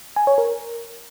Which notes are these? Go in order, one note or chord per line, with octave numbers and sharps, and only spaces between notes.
G#5
C#5
A#4